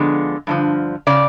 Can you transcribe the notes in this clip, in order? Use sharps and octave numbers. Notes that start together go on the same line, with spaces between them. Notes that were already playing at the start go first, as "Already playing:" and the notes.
Already playing: D3 F3 G#3 B3
G2 D3 F3
C#3 D5